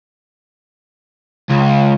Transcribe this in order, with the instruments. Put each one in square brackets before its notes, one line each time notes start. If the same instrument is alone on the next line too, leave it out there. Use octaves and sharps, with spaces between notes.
[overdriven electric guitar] C#2